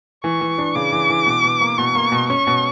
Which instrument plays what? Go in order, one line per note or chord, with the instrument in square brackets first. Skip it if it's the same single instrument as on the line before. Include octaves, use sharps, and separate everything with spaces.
[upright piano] E3 [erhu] C#6
[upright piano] E3
D4
[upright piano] C#3 [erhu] D6
[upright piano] E3
E3
B2
B2
A#3
[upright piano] B2 [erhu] C#6
[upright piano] A#3
B2
[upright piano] C#4 [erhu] C#6
[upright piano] B2